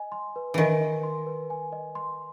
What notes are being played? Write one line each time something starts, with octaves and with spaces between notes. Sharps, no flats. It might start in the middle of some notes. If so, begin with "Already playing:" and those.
Already playing: D#5 G#5
C6
B4
D#3 E3 G#5
D#5
C6
B4
G#5
D#5
C6